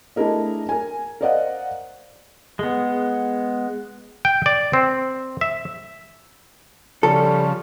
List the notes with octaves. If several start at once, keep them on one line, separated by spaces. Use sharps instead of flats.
A3 D4 E4 G#4 A#4 D#5
A#4 G#5
A#4 C5 D5 D#5 F5 F#5
G#3 B3
G5
D5
C4
E5
C#3 F3 G3 A4